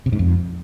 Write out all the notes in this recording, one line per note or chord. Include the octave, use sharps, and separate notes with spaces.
C3
G#2
F2